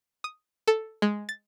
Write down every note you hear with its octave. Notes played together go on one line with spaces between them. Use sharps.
D#6
A4
G#3
A6